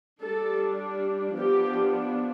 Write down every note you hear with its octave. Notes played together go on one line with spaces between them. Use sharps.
G3 D4 A4
F3 B3 D4 G4